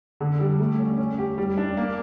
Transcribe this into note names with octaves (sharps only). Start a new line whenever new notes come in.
D3
G3
A3
C#4
C#4
G4
G3
D4
A#3